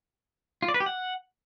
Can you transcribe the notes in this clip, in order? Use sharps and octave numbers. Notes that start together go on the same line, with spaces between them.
F4
D5
B4
G4
F#5